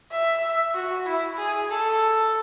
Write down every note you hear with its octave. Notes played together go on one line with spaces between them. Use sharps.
E5
F#4
E4
G#4
A4